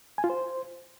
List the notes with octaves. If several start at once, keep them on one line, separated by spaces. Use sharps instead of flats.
G#5
F4
C5